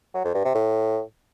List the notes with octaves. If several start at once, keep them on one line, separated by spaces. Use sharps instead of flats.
F#3
F2
G2
C3
A2